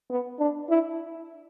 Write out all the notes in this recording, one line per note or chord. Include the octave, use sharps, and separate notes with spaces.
B3
D4
E4